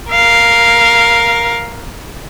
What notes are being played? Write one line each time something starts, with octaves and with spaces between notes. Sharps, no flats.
A#4 F5